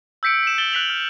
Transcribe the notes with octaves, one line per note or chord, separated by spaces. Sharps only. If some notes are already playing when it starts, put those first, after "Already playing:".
E6 G6 B6 C#7 D7
B6 E7
A6 F#7 G7
F#6 B6 F7 F#7
F6